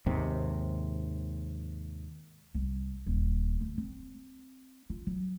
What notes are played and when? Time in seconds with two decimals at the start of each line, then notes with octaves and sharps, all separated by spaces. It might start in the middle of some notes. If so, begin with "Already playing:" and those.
0.06 D#2 G#2 C3
2.55 C2
3.06 D#1
3.61 D2
3.78 C4
4.90 F4
5.07 F#3